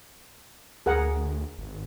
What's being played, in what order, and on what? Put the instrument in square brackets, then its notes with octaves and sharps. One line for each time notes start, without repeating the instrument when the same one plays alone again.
[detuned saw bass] D2 [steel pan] G#4 A#4 F#5
[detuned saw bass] G#1